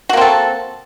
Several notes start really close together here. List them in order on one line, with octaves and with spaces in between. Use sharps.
F#4 A#3 C4 A4